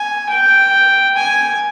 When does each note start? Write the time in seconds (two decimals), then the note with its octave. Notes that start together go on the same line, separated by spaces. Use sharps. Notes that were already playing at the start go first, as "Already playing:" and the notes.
Already playing: G#5
0.29 G5
1.17 G#5